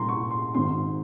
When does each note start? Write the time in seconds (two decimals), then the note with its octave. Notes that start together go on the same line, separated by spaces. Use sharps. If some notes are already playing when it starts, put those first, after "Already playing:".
Already playing: C2 A#2 A#5 C6
0.09 C#6
0.31 C6
0.54 G#1 G#2 D#3 C6